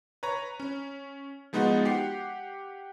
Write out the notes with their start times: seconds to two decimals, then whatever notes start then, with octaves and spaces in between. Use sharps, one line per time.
0.23 B4 C#5 A#5
0.60 C#4
1.53 F3 G#3 B3 D#4 F4 F#4
1.85 G4 F#5 C7